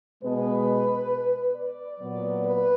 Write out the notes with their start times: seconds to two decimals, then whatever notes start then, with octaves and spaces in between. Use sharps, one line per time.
0.22 B2 G#3 B3 B4
1.55 D5
2.00 A#2 F#3 B3
2.44 B4